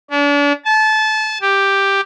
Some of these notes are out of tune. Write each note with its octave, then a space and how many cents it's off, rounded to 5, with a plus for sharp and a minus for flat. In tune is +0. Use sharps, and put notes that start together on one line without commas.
D4 -40
A5 -25
G4 +5